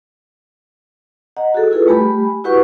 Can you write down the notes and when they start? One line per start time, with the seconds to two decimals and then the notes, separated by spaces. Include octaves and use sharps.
1.37 D#5 F#5 A#5
1.54 F#4 G#4 A4
1.71 E4 F4 G#4 A4 B4
1.87 G3 A3 G4 G#5 B5
2.44 E4 F#4 G4 B4 F#5 C#6